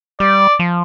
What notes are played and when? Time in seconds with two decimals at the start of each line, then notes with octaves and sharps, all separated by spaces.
0.20 G3 D5
0.59 F3